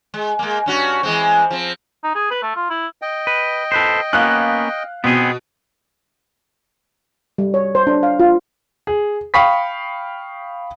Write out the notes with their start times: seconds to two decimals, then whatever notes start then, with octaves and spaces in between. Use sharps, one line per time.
0.14 G#3
0.39 G#3 A#3
0.66 G2 C#4 F#4
1.03 E3 G#3 C4
1.51 F3 C4
2.04 D#4
2.15 G#4
2.31 B4
2.42 A3
2.55 F4
2.70 E4
3.02 D#5 G5
3.27 B4
3.72 A4 B4 C5
4.13 A#3 B3 C#4 F5 F#6
5.04 B2 B3 C4 G#4
7.38 G3
7.54 C#5
7.75 C5
7.87 D4
8.03 F5
8.20 F4
8.87 G#4
9.34 F5 G5 B5 C#6 D#6 B6